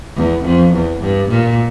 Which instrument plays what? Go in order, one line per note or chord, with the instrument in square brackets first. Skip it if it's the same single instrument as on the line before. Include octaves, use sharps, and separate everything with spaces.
[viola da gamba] E2
F2
E2
G2
A#2